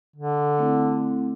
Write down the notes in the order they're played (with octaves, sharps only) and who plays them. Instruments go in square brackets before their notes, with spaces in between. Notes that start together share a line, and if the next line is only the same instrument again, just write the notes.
[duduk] D3
[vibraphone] A3 C4 E4